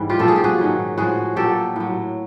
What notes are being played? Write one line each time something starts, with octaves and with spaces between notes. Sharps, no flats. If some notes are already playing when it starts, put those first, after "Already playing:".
Already playing: G#2 E3 G3
F4 G4
A#2 F3 A4
G#4
G4
F#4 G#4
G#2 D#3 F#3
A2 F3 F#4 G#4
A#2 F#3 G4 A4
A2 F#3